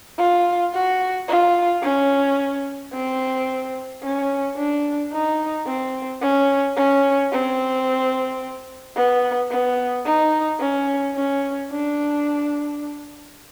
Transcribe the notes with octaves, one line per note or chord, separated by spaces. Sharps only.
F4
F#4
F4
C#4
C4
C#4
D4
D#4
C4
C#4
C#4
C4
B3
B3
D#4
C#4
C#4
D4